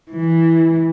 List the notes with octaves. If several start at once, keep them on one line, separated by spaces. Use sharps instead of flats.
E3